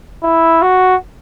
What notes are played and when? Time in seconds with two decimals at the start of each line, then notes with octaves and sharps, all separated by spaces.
0.23 E4
0.62 F#4